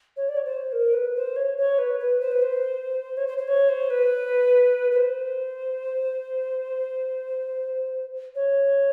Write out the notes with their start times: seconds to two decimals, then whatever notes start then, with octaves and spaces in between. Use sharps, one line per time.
0.16 C#5
0.28 D5
0.36 C#5
0.45 C5
0.72 A#4
0.93 B4
1.15 C5
1.36 C#5
1.58 C#5
1.78 B4
1.99 B4
2.21 C5
2.31 B4
2.42 C5
3.17 C#5
3.27 C5
3.38 C5
3.48 C#5
3.69 C5
3.90 B4
4.91 B4
4.96 C5
8.35 C#5